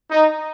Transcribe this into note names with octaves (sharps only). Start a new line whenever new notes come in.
D#4